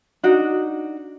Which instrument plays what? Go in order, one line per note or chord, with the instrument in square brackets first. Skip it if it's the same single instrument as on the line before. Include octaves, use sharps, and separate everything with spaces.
[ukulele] D4 D#4 F#4